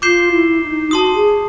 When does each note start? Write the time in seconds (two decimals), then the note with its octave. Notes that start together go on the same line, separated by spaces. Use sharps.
0.02 F4 D6 G6 C7 E7 G7
0.32 E4
0.62 D#4
0.91 F#4 A5 C6 D#6
1.15 G#4